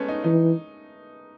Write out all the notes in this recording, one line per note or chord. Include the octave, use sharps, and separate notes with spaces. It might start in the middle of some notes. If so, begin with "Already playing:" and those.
Already playing: G#3 A3 B3 C#4
D#4
E3 D#4